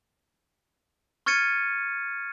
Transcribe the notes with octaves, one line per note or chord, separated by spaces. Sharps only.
C#6 F6 G#6 A6 C#7 D#7